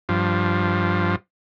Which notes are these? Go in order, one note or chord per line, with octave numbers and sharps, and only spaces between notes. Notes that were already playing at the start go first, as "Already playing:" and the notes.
G2 F3